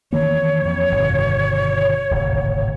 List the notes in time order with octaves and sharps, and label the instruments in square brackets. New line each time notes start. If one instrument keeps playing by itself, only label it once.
[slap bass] D#3 E3 A#3 [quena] C#5
[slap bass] F2
G1 B2 D#3
D1 G#1 C3